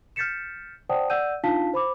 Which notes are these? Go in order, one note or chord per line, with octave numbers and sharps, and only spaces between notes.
F6 G6 A6 B6 C#7 E7
C5 D5 F#5 G5 A5 D#6
D5 F#5 E6 G6 D#7
D4 D#4 F4 F5 A5 B6
C5 B5 D6